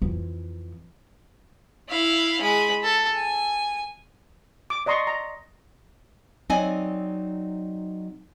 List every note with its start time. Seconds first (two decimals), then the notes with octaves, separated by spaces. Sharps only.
0.02 F2 E3
1.89 E4 F5
2.41 G#3 B5
2.83 A4
3.15 G#5
4.70 D6
4.86 D5 D#5 A#5 C6 C#6
5.07 A#5
6.50 F#3 C4 D#4 D5 D#5 G#5